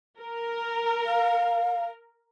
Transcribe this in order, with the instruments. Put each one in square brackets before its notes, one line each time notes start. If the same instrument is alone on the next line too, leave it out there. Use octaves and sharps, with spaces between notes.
[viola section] A#4
[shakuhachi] F5